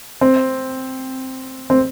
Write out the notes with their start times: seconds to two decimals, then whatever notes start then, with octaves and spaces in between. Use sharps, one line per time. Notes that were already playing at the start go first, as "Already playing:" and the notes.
0.21 C4
1.70 C4